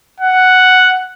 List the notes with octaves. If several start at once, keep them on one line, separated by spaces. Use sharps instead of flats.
F#5